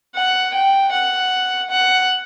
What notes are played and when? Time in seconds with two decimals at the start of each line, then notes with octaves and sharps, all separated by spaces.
0.16 F#5
0.55 G5
0.93 F#5
1.70 F#5